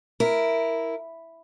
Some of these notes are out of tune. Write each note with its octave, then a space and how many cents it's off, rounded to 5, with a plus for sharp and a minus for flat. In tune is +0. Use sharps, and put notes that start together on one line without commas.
E4 +0 A#4 +0